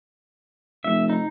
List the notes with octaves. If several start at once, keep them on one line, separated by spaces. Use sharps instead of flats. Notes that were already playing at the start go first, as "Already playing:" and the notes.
F1 E5
D#4